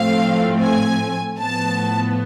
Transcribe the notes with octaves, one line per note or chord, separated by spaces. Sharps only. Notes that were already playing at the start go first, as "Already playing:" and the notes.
Already playing: A2 F3 A3 C4 F5
G#5
A2 F3 B3 A5